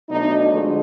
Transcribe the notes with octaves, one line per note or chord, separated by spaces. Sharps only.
B2 F#3 A3 D4 D#4
D3 F3 G#3